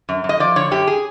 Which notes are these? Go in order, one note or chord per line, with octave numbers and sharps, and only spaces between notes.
F#2
F#2
D#5
F3 D5
D3 C#5
F#2 G4
G#4